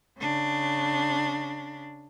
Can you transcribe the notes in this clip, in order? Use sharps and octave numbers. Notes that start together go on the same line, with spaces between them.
C#3 D4